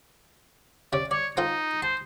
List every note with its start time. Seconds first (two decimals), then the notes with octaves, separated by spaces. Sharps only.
0.93 C3 C#4 D5
1.11 C#5 D5
1.37 C4 D#4 F4 A4
1.82 C5 A5